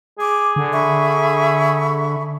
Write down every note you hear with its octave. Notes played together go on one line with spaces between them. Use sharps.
G#4 D6
D3
E5 B5 C#6